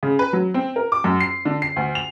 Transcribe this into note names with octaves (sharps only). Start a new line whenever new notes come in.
C#3
B4
F#3
C4
A#4
D6
F#2
C7
D3
C7
D2
F7